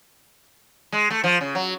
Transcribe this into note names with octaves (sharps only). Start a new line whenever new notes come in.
G#3
A3
F3
C#3
F#3